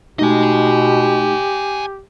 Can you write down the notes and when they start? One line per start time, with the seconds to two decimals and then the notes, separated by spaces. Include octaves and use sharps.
0.19 B2 A3 D#4 G4 D#5 G#5